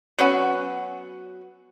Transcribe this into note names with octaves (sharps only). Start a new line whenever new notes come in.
F#3 B3 C#4 F#4